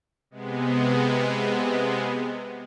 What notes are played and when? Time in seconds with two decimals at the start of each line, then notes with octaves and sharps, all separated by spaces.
0.31 C3 G#3 B3